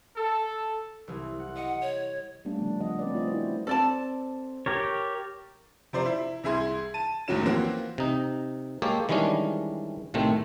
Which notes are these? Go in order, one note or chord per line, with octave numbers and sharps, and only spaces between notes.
A4
C2 E3
F#5
D#5 F#5 C#7
C#5
G3 A3 B3 C#4 D4
C#3 F3 A3
F3 D4 D#5 F#5
C4 C#4 B4 D5
A3 F4 C#5 D#5
E4 F#4 A#4 C5
C4 A4 D5 A5
G4 A#4 C#5 A6
C3 F3 C5 D5 A#5
E4
C2 E4 G#4 C6 G#6
A5 D#7
F#1 D#2 A2 F#3 C#4 E7
E3 F3 A#3 C4 C#4 F#4
C3 D#4
G#3 A#3 G4 A4 C#5
D#3 E3 G3 G#3 C#4 D4
A2 C3 D#3 A3 C4